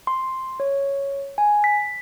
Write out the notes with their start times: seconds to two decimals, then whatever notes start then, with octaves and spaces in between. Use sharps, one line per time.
0.07 C6
0.60 C#5
1.38 G#5
1.64 B6